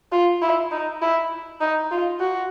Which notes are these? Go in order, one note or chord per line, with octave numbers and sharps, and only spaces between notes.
F4
E4
D#4
E4
D#4
F4
F#4